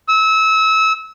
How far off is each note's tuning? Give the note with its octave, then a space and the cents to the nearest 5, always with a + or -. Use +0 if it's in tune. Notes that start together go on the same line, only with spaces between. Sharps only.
E6 -30